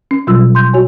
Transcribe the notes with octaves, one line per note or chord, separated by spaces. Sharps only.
C#4
B2 F#3 G3 F4 E6
C6 G6
F#4 C#5 G#5